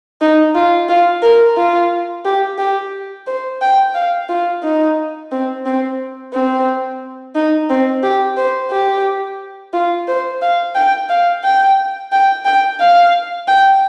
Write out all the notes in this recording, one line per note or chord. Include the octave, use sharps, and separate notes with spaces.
D#4
F4
F4
A#4
F4
G4
G4
C5
G5
F5
F4
D#4
C4
C4
C4
D#4
C4
G4
C5
G4
F4
C5
F5
G5
F5
G5
G5
G5
F5
G5